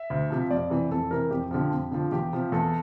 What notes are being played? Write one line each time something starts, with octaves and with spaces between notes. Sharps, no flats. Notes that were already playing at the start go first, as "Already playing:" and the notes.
Already playing: E5
D2
C3 F3
F2 D5
C3 E3
F2 A4
C3 E3 A#4
F2 G4
D3 F3 G4
F2
D3 F3
E2 G4
C3 F3
E2 A4